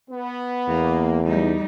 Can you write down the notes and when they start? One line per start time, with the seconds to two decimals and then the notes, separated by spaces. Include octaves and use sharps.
0.11 B3
0.68 E2 A#3
1.25 G3 A3 D#4